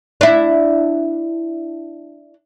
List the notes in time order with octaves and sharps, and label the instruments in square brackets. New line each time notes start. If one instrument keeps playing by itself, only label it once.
[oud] D4 E4